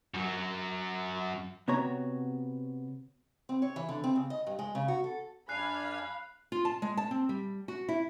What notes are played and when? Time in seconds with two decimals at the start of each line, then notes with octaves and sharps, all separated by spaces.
0.14 F#2 F#3
1.68 C3 B3 F#4 C#5 A#5
3.49 C4
3.62 C#5
3.76 E3
3.89 D3
4.04 C4
4.16 C#3
4.30 D#5
4.47 G2
4.59 G#3
4.75 C#3
4.88 F#4
5.04 A4
5.49 F#2 D4 F5 G#5 B5 F#6 C7
6.52 F4
6.65 A5
6.82 G#3
6.97 A5
7.11 C4
7.29 G3
7.68 F#4
7.89 E4